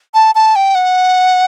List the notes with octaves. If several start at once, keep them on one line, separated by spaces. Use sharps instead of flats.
A5
A5
G5
F#5